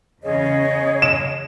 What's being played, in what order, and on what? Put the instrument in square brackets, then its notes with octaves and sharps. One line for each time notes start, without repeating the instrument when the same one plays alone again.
[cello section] E2 C#3 [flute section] G#4 C#5 [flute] D#5
[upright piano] E7